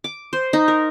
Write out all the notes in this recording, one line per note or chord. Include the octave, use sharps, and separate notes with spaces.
D6
C5
D#4
A#4